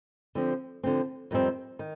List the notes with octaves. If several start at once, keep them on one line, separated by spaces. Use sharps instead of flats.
D3 F3 C4
D3 F3 C4
F2 D#3 G3 C4
D#3